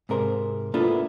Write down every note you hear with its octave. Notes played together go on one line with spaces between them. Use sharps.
G#2 C3 A#4 C5
A#3 B3 D4 E4 F4 A4